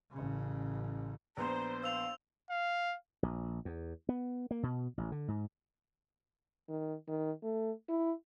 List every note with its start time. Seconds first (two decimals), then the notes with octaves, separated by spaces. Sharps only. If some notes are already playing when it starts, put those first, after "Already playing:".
0.12 A1 C#3
1.37 A#1 B3 C5 A#5 C6
1.84 F5 E6 F7
2.50 F5
3.23 A#1
3.65 E2
4.09 B3
4.51 A#3
4.63 B2
4.98 A1
5.12 D3
5.28 G#2
6.69 D#3
7.08 D#3
7.43 A3
7.89 E4